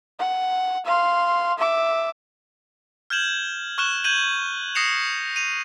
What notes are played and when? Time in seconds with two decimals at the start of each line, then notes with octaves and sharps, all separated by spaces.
0.19 F#5
0.85 F5 C6
1.58 E5 D6
3.10 F6 G6 G#6 E7 F#7
3.78 C#6 F6 F#6 E7 G7
4.04 G6 G#6 D#7 F#7
4.75 D#6 A#6 C7 C#7 E7 F7
5.36 D#7 F7